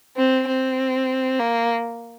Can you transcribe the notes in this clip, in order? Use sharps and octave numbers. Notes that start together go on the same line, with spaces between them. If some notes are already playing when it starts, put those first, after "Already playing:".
C4
C4
A#3